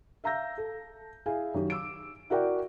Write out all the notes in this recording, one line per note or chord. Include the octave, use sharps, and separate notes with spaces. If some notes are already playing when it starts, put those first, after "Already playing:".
E5 F5 A#5 E6 G6 A#6
A4
E4 G#4 E5 F5 G#5
F#2 D#3 G4
D6 E6 D7
E4 F#4 A#4 D5 F#5 G5